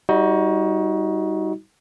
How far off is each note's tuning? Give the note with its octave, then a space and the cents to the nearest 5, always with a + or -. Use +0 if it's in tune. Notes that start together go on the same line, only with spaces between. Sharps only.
G3 -5 D#4 +30 F#4 +0